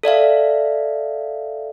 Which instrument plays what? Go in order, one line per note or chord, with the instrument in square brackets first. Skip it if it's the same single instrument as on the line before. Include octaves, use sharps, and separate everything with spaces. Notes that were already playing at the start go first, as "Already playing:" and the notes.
[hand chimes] A4 D5 E5 F5